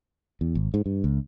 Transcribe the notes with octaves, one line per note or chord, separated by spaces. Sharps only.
E2
G#1
G#2
G2
C#2